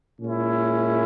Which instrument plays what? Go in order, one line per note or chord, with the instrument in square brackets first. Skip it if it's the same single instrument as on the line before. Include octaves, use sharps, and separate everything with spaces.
[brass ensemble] A#2 G#3 C#4 E4